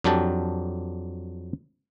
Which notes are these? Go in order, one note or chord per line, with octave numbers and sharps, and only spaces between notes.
F2 F#3 D4 G4 A5